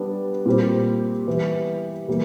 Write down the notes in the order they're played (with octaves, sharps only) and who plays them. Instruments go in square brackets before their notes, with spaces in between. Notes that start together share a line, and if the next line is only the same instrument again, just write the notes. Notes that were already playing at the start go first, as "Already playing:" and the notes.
Already playing: [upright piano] G3 B3 D4
A#2 G3 C4
E3 G3 B3
E3 G3 A#3